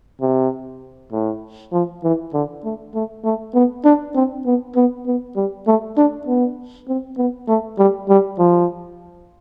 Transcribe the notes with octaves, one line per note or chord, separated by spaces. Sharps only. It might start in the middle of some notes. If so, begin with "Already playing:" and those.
C3
A2
F3
E3
D3
A3
A3
A3
B3
D4
C4
B3
B3
B3
G3
A3
D4
B3
C4
B3
A3
G3
G3
F3